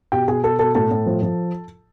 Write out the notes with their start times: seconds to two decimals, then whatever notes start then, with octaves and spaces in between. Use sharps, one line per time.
0.12 B2 G4 G5
0.27 B2 G#4 G#5
0.44 B2 A4 A5
0.59 B2 A4 A5
0.75 A2 A4 A5
0.91 A2
1.06 F3
1.22 F3